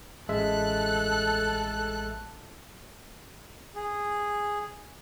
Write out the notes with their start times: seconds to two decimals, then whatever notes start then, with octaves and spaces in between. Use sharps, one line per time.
0.29 A1 G#3 A4 E5 F#6
3.75 G#4